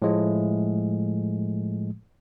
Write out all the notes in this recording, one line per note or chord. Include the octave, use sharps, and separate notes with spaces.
A2 F3 G#3 A3